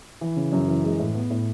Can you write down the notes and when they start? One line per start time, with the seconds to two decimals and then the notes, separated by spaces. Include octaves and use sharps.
0.21 E3
0.36 C#3
0.53 F#2
0.68 E3
0.84 G#3
0.99 A2
1.15 B3
1.30 A2